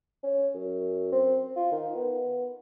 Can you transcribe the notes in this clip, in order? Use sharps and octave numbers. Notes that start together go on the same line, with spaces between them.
C#4
F#2
C4
F4
D#3
B3